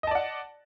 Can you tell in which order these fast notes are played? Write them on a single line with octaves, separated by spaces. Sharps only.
D#5 A5 D5 F#5